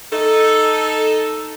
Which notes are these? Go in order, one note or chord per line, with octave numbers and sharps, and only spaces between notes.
D#4 A4